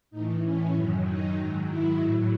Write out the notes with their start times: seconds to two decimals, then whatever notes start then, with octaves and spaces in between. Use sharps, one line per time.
0.11 A2 E3 D#4
0.43 C#4
0.74 F#2 D#3 F#3
1.05 D#4
1.35 G#2 D#3 F#3
1.67 E4
1.98 A2 F#3